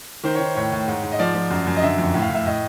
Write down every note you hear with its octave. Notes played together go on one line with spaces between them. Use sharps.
D#3 C5
C#5
D#3
C5
A2 C#5
A2
G#2
G#2
D#5
F3 D5
F3
F#2
F#2
D#5
D3 E5
F2
A2
F5
A2 E5
A2 D#5